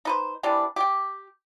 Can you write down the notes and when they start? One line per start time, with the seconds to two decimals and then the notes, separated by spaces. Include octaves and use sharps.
0.05 D#4 B4 C5
0.43 C3 E3 G3 D4
0.76 G4 G5